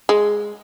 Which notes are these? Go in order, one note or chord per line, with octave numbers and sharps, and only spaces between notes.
G#3